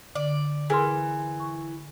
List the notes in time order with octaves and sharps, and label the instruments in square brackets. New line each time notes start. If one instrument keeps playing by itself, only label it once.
[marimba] D3 [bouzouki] D5
[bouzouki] E3 [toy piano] G#4 B4 C6 [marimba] A#4 E6
[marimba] C#6